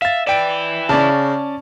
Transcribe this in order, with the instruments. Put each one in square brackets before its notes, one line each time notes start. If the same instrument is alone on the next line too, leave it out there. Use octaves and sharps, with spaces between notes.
[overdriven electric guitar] E5 [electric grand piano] F5 A6
[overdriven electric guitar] E4 B4 [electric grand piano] D5 G5 D7
[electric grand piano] C#3 [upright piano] C#4 D5 A5